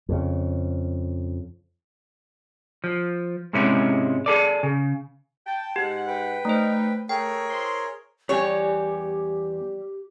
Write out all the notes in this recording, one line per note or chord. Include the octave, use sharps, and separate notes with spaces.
F2 C#3
F3
G#2 C3 G#3 C#4 E4
G#4 A4 D5
C#3
G5 A5
G#2 G4 F#5
B4 G5
A3 D#4 C5
A3 G#4 A#4 C#5 G5
E4 C5 C6
E2 G3 E4 G4 C#5 G#5